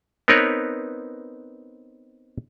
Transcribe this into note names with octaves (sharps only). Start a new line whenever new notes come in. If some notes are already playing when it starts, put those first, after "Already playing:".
B3 C4 D#4 A#4 B4 C#5